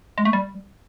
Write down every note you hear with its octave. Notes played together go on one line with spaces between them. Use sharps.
G#3
A3
G3